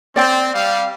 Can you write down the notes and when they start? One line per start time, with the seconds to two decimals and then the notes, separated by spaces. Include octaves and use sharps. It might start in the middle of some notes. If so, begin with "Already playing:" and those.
0.16 C4 D5 G5
0.54 G3 F5